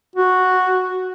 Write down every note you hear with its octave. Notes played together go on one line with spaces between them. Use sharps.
F#4